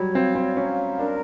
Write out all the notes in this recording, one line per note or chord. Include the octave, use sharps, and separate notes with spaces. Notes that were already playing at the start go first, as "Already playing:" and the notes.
Already playing: F#3 G3 C#5
C4 F5
C4
C#4 A#5
D4 A#4